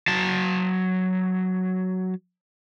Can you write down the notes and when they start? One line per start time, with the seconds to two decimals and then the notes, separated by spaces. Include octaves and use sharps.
0.08 F#3 A5